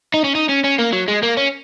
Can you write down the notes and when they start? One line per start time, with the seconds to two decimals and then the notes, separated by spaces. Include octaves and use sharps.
0.14 D#4
0.24 C#4
0.35 D#4
0.49 C#4
0.64 C#4
0.79 A#3
0.93 F#3
1.08 G#3
1.23 A#3
1.37 C#4